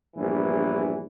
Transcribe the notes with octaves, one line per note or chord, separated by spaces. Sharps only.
A#1 E2 G2 E3